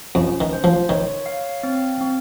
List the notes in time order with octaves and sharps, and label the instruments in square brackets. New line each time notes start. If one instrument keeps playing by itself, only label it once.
[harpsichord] F2 [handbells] C#4
[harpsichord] D#3
[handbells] C5
[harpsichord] F3
[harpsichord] D#3 [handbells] C#5
[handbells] F5
C4
C4